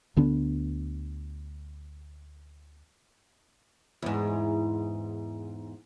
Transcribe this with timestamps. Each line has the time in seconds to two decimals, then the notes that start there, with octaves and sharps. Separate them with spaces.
0.17 D2 D3 B3 D4
4.02 E2 G#2